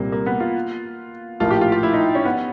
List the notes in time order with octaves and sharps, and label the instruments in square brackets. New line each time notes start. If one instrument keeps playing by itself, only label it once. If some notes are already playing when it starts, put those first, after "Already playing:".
Already playing: [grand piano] C2 A#2 G3 C4 [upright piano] A#3
[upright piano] A#3
B3
F4
[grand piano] A#1 A2 F3 A#3 [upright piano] F4
[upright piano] G4
F4
F4
E4
D#4
C#4
B3